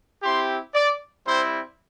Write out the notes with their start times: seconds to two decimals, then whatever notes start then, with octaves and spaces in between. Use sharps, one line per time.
0.23 C4 E4 G4 C6
0.74 D5
1.26 G3 C4 E4 C5